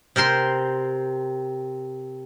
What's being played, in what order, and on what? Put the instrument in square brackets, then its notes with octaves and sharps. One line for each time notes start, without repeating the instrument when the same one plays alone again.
[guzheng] C3 A#4 C5 C6